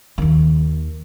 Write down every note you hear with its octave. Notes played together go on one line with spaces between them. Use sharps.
D#2 D#3